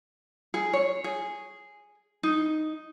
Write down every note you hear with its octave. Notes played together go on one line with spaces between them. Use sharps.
G#4
C#5
G#4
D#4